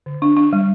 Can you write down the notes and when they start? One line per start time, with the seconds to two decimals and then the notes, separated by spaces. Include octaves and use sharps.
0.06 D3
0.22 D4
0.37 D4
0.53 G3